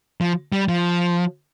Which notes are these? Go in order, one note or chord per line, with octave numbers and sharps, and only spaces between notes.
F3
G3
F3